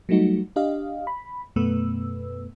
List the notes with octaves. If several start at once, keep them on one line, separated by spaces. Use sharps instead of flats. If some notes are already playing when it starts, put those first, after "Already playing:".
F#3 G3 A3 D#4 F#4
D4 G4 D#5 F5
B5
F#2 B2 A3 B3 B4 E6